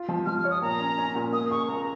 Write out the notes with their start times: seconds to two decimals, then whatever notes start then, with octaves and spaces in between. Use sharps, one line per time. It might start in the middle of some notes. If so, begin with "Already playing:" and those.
Already playing: F4
0.09 F3
0.26 F3 F6
0.39 F6
0.44 C#5
0.51 D#6
0.62 A#2 A#5
0.80 C#4
0.98 C#4
1.15 A#2
1.32 A#3 D#6
1.51 C#2 C#6
1.68 A#3 A#5